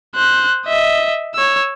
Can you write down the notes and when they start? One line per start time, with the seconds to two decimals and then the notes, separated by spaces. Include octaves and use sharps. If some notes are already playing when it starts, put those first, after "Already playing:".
0.16 C5 F#6
0.67 D#5 E5
1.34 C#5 E6